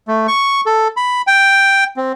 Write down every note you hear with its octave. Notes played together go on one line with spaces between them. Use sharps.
A3
C#6
A4
B5
G5
C4